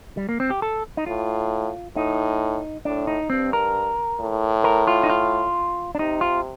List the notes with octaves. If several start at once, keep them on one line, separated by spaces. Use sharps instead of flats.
G3
A#3
C4
G4
A4
D#4
A2 F4
A2 D#4
A2 D4
D#4
G2 C4
A#4
A2
A#4
F4
D#4
F4
D4
C3 D#4
F4